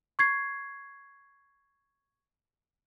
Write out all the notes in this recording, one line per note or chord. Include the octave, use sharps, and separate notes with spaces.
C#6 G#6 C7